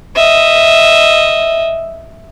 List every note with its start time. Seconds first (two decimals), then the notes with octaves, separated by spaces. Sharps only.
0.16 D#5 E5